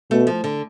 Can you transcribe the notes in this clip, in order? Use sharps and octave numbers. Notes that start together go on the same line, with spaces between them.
B2 A3
F3
D3